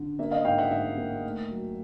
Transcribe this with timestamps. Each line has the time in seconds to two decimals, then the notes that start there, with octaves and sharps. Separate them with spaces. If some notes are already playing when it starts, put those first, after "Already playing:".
Already playing: D3
0.19 A#3 E5
0.31 D#5 F5
0.45 G#2 F5 G5
0.58 E5 F#5
0.71 G#2 E5
0.97 A#3
1.24 A3
1.51 F#3